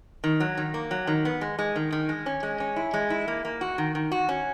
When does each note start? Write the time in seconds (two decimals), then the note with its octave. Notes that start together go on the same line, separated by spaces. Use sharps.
0.24 D#3
0.40 F#3
0.57 D#3
0.74 A#3
0.91 F#3
1.07 D#3
1.25 B3
1.41 G#3
1.59 G#3
1.76 D#3
1.92 D#3
2.09 G#3
2.26 C#4
2.43 G#3
2.60 C#4
2.76 E4
2.94 G#3
3.10 E4
3.28 A#3
3.45 A#3
3.61 F#4
3.78 D#3
3.95 D#3
4.12 F#4
4.29 C#4